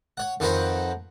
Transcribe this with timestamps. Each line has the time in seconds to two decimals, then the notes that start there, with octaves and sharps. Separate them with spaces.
0.17 C#5 F#5
0.40 F2 D#3 F#4 B4 C5 F#5